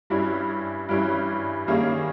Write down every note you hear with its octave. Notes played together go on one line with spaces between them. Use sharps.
G2 G3 C#4 E4
G2 G3 C#4 E4
D#3 G3 A#3 C#4 G#4